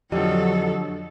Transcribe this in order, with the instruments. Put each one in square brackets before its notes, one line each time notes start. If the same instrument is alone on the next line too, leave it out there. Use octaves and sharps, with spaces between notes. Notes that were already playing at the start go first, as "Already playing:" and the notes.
[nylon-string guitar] F2 D4 G4 [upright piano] D3 F3 [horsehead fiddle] F#3 A4 [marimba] D#5